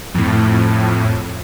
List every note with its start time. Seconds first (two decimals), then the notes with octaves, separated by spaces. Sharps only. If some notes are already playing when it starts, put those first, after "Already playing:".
0.14 F2 A2